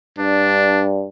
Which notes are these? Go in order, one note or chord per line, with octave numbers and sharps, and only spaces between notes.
G2 D4